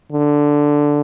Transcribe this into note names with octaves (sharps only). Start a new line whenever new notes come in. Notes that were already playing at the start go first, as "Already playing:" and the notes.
D3